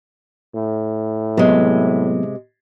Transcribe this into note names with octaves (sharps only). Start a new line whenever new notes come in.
A2
C3 F#3 G#3 B3